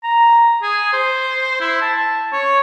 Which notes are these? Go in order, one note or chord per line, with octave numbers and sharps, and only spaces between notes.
A#5
G#4
C5
E4
A5
C#5